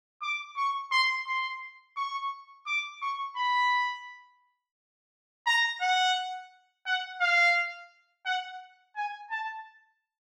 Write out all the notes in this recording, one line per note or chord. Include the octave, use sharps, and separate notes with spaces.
D6
C#6
C6
C6
C#6
D6
C#6
B5
A#5
F#5
F#5
F5
F#5
G#5
A5